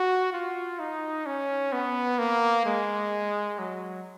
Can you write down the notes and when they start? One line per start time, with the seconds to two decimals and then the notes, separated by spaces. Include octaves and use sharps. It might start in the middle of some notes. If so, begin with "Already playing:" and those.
Already playing: F#4
0.33 F4
0.79 D#4
1.26 C#4
1.72 B3
2.19 A#3
2.66 G#3
3.59 F#3